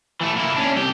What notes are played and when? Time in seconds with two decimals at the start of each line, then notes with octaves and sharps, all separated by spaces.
0.21 E3 A3
0.37 A#3 E4
0.57 C#4 D4
0.76 C2 G4